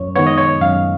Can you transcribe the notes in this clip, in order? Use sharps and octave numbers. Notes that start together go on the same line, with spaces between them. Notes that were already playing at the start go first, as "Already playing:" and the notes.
Already playing: F#2 C#5
D#3 G#3 B3 C#5
D#5
C#5
F#2 F5